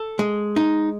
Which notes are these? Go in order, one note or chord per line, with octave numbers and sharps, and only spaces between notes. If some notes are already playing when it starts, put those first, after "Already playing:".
Already playing: A4
G#3
D#4